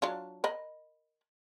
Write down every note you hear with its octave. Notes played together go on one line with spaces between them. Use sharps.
F#3 D4 F4
A#4 D#5 B5